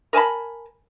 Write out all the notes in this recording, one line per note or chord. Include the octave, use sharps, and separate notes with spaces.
A#4 G#5 A5 B5